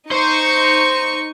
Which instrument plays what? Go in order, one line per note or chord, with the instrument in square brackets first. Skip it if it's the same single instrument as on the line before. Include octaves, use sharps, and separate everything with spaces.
[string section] D#4 C#6 [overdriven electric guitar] C5